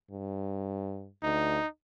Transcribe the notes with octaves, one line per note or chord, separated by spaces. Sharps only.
G2
D2 D#4